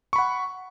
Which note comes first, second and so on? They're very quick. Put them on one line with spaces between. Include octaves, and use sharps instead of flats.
C#6 B5 F#5